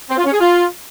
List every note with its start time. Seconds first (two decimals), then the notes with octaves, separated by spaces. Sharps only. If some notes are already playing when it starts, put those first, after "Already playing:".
0.10 C4
0.17 F4
0.25 C#4
0.32 G#4
0.40 F4